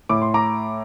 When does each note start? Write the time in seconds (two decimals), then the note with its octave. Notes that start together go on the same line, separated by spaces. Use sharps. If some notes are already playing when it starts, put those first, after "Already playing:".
0.09 A2 D6
0.22 C6
0.34 A#5 D6